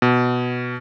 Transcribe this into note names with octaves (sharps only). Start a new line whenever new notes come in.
B2